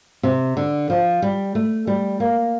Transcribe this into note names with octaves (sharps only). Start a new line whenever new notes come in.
C3
D3
F3
G3
A3
G3
A#3